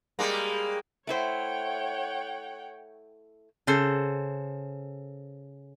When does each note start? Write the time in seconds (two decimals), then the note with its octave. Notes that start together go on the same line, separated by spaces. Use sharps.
0.19 G3 G#3 A#3
1.07 A3 E4 C5 C#5 F#5 G5
3.67 C#3 A4 C5